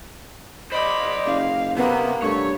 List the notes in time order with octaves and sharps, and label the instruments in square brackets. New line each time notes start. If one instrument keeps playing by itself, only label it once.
[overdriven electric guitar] C5 D5 [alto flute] D#5 [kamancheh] B5
[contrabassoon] F#1 [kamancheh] F5
[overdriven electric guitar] C3 [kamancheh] A#3 [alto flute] B3
[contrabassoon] G2 [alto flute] A3 [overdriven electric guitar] C#5